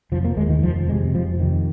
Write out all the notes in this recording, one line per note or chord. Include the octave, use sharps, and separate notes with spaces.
F1 F3
A#3
D#2 G#3
D#3
F1 F3
F2 C3 G#3
F1 F3
F2 C3 D#3